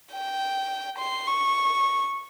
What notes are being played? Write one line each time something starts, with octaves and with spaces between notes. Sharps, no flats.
G5
C6
C#6